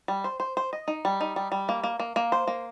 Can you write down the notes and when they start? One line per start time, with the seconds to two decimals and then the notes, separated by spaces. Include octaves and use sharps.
0.08 G3
0.24 C5
0.40 C5
0.57 C5
0.73 D#5
0.88 D#4
1.05 G3
1.21 D#4
1.36 G3
1.52 G3
1.69 A#3
1.84 A#3
2.00 A#3
2.16 A#3
2.32 C5
2.47 A#3